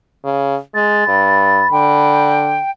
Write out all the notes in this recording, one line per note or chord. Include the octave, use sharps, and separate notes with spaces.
C#3
G#3 A6
G2 B5
D3 G5